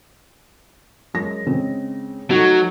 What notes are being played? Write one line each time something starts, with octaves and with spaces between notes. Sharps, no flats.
F#2 G#3 A#6
C#3 G#3 C4
F#3 A3 D#4 F#4